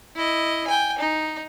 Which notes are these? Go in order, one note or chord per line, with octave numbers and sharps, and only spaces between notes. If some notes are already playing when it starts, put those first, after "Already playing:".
E4 D#5
G5 G#5
D#4